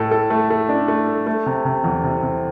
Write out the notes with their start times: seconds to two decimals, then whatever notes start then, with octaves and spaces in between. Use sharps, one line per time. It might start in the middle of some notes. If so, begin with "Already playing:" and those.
Already playing: A2 A4
0.11 A4
0.30 A3
0.50 A3
0.69 D4
0.88 A3
1.07 A4
1.27 A3
1.46 C3
1.65 C3
1.84 E2
2.04 C3
2.22 C3